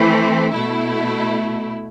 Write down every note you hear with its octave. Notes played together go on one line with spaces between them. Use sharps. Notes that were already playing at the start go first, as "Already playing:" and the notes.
Already playing: E3 A3 C4
B2 A3 E4